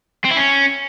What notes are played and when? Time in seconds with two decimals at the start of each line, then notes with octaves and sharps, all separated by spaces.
0.25 C4
0.31 E4
0.37 C#4